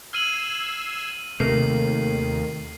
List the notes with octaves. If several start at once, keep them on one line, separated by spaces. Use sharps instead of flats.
E6 F6 G#6 C7 D#7 F#7
D#2 C3 D#3 A3 A#3 C7